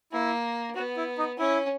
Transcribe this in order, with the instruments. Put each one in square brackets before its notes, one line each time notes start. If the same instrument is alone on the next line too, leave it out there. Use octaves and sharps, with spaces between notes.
[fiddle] A#3 [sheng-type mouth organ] E4
[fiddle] B3 [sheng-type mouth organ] F#4
[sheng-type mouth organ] E4
D#4
[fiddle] C#4 [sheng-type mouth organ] E4